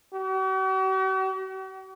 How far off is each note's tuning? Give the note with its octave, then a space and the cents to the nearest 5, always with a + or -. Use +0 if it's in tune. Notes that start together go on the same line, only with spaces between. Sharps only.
F#4 +45